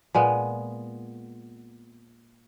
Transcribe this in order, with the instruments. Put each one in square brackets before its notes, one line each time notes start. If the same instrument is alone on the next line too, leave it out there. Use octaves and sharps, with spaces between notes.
[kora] A#2 G#3 B3